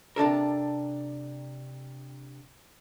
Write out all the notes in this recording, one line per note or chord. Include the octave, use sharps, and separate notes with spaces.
C3 D4 A4 A#4